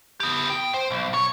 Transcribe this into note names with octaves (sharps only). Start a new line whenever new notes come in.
B3 G4
G5
C5
B1
C#5